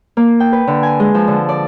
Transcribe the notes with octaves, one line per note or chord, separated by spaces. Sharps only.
A#3
G5
B4
D3
G#5
G#3
F3
D3
D5